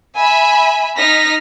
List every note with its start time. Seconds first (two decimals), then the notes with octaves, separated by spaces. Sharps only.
0.17 E5 G#5 B5
0.97 D#4 F6 A#6 B6